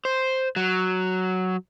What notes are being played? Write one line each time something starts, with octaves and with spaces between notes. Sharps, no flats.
C5
F#3